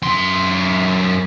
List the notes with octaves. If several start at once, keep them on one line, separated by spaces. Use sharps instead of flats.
F#2 C6